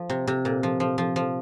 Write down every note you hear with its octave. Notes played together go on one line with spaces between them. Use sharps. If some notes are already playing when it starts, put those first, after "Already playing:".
Already playing: F3
C3
C3
A#2
F3
F3
F3
F3